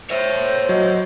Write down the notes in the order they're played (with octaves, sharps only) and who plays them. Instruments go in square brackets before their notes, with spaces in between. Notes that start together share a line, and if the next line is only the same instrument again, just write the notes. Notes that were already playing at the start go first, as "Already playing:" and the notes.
[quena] C5 [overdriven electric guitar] C#5 E5
[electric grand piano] F#3 [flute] D#5